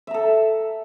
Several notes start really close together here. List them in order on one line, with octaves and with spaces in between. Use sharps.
E5 A#5 A4